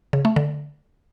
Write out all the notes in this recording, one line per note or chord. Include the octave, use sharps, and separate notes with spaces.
C#3
A3
D3